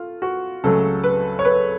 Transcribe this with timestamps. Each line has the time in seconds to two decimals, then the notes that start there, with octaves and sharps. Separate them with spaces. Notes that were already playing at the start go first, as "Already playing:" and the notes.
Already playing: A3 F4
0.22 F#4
0.64 C#2 C#3 F#3 A3 A4
1.04 B4
1.39 C#5
1.45 B4